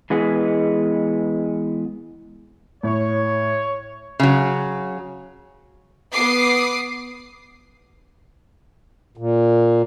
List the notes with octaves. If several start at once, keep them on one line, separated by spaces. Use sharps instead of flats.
E3 G#3 B3 G#4
A2 C#5
C#3 F#3
B3 D6 D#6 C7
A#2